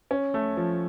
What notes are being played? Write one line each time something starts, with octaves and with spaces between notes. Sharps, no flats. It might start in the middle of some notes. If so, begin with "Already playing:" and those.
C#4
A3
F3